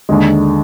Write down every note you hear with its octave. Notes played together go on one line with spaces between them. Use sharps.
D#2 D3 G#3